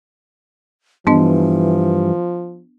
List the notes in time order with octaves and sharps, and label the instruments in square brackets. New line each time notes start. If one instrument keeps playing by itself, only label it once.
[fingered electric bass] G2 [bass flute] E3 [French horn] F3 [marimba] B3 D4 D#5